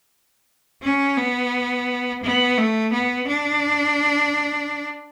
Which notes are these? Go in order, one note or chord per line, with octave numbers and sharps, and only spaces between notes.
C#4
B3
B3
A3
B3
D4